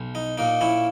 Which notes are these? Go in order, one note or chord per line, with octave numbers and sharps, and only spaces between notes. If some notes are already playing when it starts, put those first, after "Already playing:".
Already playing: B1
D#4
A#2 A#3 D#4
C#4 E4